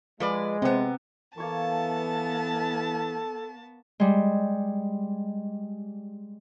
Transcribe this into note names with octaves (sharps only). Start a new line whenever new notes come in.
F3 G#3 B4 D5
C3 B3 C4
E3 A#3 B3 A4 C#5 A5 C#6
G3 G#3